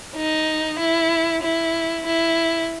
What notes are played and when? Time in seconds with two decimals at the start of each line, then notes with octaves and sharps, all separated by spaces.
0.17 D#4
0.79 E4
1.43 E4
2.06 E4